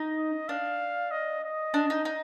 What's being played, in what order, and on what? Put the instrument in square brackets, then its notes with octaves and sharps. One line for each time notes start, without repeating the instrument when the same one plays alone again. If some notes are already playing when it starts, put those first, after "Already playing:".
Already playing: [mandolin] D#4
[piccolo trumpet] D#5
[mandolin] D4 [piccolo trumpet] F5
[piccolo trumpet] D#5
D#5
[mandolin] D4
D#4
D#4